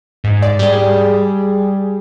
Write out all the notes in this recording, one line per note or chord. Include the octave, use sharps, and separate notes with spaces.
G#2
D5
G3 G#4